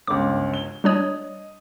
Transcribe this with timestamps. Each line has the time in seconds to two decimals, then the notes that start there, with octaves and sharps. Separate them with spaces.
0.07 G1 C#2 D6
0.54 G7
0.84 G3 D4 C#5 D#5 D#6